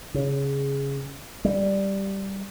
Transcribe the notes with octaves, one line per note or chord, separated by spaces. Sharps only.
C#3
G3